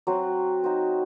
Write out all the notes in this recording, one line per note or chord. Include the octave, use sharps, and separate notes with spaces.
F#3 C4 F#4 C5
D#4 F#4 C5